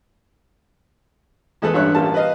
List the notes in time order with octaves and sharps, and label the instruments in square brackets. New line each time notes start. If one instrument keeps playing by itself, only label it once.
[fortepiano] E2 G#3 A4 B4
A1 G2 D4 C#5 E5 F#6
A1 G3 A#3 F4 A5
B4 D#5 F5